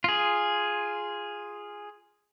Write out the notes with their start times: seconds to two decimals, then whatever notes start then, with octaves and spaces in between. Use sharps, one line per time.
0.04 F4 G#4